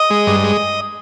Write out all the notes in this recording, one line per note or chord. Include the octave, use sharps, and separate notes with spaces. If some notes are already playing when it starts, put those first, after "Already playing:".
Already playing: D#5
G#3
G2
G#3